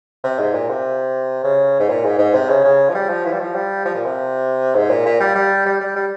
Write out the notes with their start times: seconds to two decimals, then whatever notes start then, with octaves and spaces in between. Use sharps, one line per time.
0.24 C3
0.39 G#2
0.54 A#2
0.69 C3
1.44 C#3
1.79 G#2
1.89 A#2
2.05 G#2
2.19 G#2
2.34 C3
2.49 C#3
2.64 C#3
2.89 F3
2.94 G3
3.09 F3
3.25 E3
3.32 G3
3.40 F3
3.55 G3
3.85 F3
3.95 A#2
4.05 C3
4.75 G#2
4.90 A#2
5.05 A#2
5.20 G3
5.35 G3
5.66 G3
5.80 G3
5.96 G3